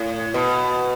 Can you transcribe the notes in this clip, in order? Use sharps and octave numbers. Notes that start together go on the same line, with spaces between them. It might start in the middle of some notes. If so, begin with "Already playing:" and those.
Already playing: A2
B2